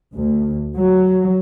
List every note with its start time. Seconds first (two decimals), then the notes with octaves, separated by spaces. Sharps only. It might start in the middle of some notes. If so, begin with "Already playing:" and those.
0.14 D2
0.74 F#3